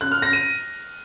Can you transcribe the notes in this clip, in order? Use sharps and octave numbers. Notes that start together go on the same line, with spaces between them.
F#6
F6
A#6
D#7